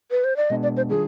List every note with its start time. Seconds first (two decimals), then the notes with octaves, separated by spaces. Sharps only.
0.11 B4
0.24 C5
0.37 D5
0.50 B2 G#3 B3 D4 D#5
0.63 D5
0.77 C5
0.90 D#3 G3 D4 F4 G#4